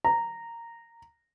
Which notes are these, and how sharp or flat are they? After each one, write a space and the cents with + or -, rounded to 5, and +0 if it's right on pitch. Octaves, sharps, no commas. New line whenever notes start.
A#5 -10